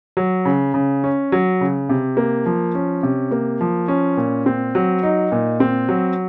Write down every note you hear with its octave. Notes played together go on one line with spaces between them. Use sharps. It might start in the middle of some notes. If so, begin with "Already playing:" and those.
F#3
C#3
C#3
C#4
F#3
C#3
C3
A#3
F3
C#4
C3
A#3
F3
C#4
A#2
C4
F#3
D#4
A#2
C4
F#3